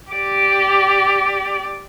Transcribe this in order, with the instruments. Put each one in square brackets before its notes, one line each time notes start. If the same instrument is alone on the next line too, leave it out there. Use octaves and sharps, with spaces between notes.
[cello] G4 D5